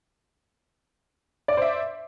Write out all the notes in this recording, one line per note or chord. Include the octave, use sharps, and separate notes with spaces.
C5 D5 E5 D6